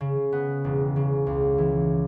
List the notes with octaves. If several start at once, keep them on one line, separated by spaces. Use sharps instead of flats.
C#3
B3
E1
C#3
C#2
E3